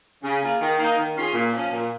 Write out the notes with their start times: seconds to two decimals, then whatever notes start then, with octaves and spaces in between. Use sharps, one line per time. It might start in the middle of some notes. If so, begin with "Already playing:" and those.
0.23 C#3
0.41 A#3 F4 G#4
0.61 D#3
0.79 A#3 D#4
0.97 D#3
1.15 C#4 F4 G#4
1.34 A#2
1.52 F3 C#4
1.71 A#2